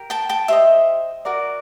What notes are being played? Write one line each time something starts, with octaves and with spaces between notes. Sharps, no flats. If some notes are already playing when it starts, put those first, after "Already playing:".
Already playing: G4 A#4
G5 A5
G5 A5
G4 C5 D#5 E5
F#4 A#4 D5